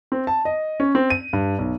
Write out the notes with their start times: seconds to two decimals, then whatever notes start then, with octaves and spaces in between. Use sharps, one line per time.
0.12 C4
0.27 A5
0.45 D#5
0.80 C#4
0.95 C4
1.10 D#7
1.33 G2
1.59 B1